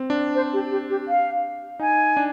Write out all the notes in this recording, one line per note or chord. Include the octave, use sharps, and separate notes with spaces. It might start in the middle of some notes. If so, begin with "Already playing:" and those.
Already playing: C4
D4
C5
G4
G4
G4
F5
D#4 G#5
D4